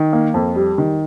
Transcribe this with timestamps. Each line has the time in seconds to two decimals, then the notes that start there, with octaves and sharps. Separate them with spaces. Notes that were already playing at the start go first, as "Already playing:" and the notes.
Already playing: D#3
0.13 A#3
0.34 F2
0.56 G3
0.78 D#3